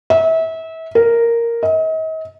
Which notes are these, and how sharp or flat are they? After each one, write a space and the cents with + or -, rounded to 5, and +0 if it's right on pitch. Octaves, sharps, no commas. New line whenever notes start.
E5 -30
A#4 -5
D#5 +40